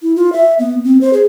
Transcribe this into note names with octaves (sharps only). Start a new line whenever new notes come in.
E4
F4
E5
B3
C4
C5
G#4